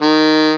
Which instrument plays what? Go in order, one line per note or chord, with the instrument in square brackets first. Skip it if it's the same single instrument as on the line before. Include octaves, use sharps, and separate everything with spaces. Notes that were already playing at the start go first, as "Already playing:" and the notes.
[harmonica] D#3